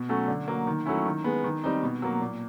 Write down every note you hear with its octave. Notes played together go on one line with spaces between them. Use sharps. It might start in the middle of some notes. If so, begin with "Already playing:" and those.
Already playing: B2
F#3 A3 C#4
D3
F#3 A#3
D#3
F#3 A3 C#4 E4
D#3
G#3 B3
D#3
G3 C4 D#4
B2
F#3 A#3
A#2